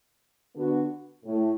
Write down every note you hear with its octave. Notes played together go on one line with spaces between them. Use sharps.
D3 B3 D4 F#4
A2 A3